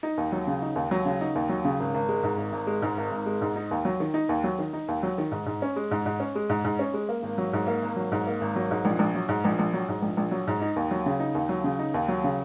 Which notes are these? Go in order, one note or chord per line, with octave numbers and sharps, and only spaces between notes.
D#4
D#2
F#3
C#3
D#4
D#2
F#3
C#3
D#4
D#2
F#3
C#3
G#1
G#1
G#3
G#2
G#1
G#1
G#3
G#2
G#1
G#1
G#3
G#2
D#4
D#2
F#3
D#3
D#4
D#2
F#3
D#3
D#4
D#2
F#3
D#3
G#2
G#2
C#4
G#3
G#2
G#2
C#4
G#3
G#2
G#2
C#4
G#3
A#3
G#1
F#3
G#2
A#3
G#1
F#3
G#2
A#3
G#1
F#3
G#2
A#1
A#1
F#3
G#2
A#1
A#1
F#3
G#2
A#1
A#1
F#3
G#2
D#4
D#2
F#3
C#3
D#4
D#2
F#3
C#3
D#4
D#2
F#3
C#3